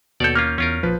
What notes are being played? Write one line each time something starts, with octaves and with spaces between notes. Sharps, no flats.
D#2 B2 A4 C#5 D5 G6
A#3 C#4 F4 F6
E2 C#4 F4 A#4
A#1 F3 B4